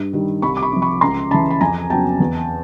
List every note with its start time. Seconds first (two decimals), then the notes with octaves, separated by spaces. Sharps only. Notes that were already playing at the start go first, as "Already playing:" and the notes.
Already playing: G2
0.13 D#3 G3
0.42 C2 B5 C#6
0.57 D6
0.62 B5 C#6
0.72 C3 F3
0.82 B5 C#6
1.01 C#2 A#5 C6
1.31 C#3 E3 A5 B5
1.51 B5
1.61 F2 G#5 A#5
1.90 C#3 F#3 B3 G5 A5
2.20 E2